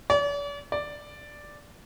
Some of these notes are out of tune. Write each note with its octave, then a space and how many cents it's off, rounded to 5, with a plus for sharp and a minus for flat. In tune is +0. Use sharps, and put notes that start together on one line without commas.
D5 -45
D5 +0